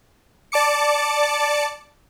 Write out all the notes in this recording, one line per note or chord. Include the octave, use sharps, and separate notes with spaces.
D5 A5 D6 C#7